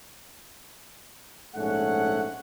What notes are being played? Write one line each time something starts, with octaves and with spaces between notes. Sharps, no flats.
A#1 G#2 A3 C#4 F#5